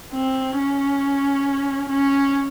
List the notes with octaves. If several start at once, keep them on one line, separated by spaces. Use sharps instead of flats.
C4
C#4
C#4